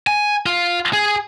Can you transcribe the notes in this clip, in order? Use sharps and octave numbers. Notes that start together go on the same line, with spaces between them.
G#5
F4
G#4